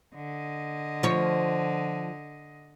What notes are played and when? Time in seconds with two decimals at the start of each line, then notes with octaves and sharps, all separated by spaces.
0.15 D3 D#5
1.03 F3 C#5